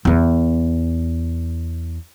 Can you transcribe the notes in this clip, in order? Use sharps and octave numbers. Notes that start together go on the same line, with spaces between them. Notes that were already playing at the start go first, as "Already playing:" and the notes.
E2 B3